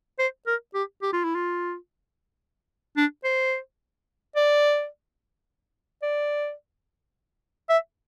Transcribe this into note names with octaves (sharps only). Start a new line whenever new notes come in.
C5
A#4
G4
G4
F4
E4
F4
D4
C5
D5
D5
E5